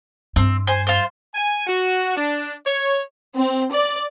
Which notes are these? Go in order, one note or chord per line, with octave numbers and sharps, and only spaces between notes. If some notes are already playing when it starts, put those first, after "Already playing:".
G2 C4
C5 G#5
F4 C5
G#5
F#4
D4
C#5
C4
D5